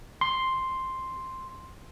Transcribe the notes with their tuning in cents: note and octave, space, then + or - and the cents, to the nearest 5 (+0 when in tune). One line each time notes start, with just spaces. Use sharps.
C6 +0